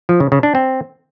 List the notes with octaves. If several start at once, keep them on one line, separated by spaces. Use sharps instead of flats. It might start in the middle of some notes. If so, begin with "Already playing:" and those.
F3
C#3
C#3
D4
C4